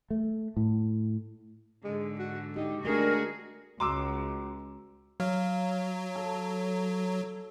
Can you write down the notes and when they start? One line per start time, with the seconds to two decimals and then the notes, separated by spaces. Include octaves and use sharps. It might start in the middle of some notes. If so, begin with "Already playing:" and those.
0.10 A3
0.57 A2
1.84 G#2 D3 G#3
2.19 F#4
2.56 D#4 G4
2.85 D3 G#3 A3 D4 F#4 G#4 A#4
3.80 C#2 F#4 A#5 C6 D6 E6
5.20 F#3 F5
6.16 A4